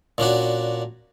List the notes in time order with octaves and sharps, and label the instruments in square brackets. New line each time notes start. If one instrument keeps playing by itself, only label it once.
[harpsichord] A#2 C#4 D4 F#4